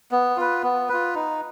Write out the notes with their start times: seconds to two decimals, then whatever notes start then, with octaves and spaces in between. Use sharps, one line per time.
0.11 B3
0.37 F4 B4
0.63 B3
0.89 F4 B4
1.15 D#4